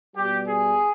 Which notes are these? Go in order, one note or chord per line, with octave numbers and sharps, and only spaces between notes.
B2 G3 G4
G#4